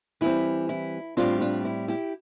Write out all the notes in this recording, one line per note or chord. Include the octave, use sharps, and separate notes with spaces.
E3 G3 C4 E4
E4
A2 G3 C4 D4 F4
D4 F4
E4
E4 G4